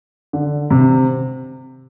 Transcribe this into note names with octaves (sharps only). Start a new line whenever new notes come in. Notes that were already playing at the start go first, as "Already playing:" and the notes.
D3
C3